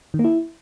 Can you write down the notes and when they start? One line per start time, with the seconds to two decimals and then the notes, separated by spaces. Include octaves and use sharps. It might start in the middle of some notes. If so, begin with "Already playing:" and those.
0.14 D#3
0.19 A#3
0.24 E4